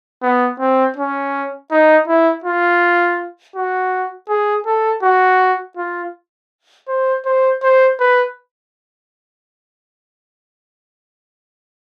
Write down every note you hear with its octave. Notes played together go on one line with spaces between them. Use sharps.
B3
C4
C#4
D#4
E4
F4
F#4
G#4
A4
F#4
F4
C5
C5
C5
B4